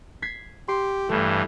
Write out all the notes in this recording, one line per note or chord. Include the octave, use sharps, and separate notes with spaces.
G#6 B6 C7
G4 C6
G2 E3 A3